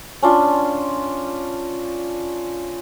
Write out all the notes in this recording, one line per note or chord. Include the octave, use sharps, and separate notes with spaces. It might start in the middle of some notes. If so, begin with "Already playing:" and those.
C#4 D4 F4